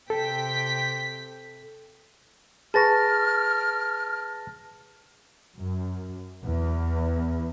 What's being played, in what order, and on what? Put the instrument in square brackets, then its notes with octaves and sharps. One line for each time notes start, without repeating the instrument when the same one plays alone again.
[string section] C3 G5 B6 [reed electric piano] A4
[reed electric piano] G#4 B4 C#6 [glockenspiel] A5 A6 A#6 [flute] F6
[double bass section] F#2
E2